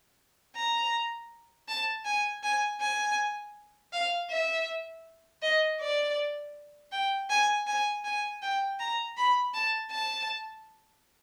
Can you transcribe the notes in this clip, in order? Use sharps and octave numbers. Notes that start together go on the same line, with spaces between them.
A#5
A5
G#5
G#5
G#5
F5
E5
D#5
D5
G5
G#5
G#5
G#5
G5
A#5
B5
A5
A5